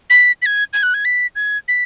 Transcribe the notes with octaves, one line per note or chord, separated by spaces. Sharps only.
B6
B6
G#6
G#6
F#6
G#6
B6
G#6
B6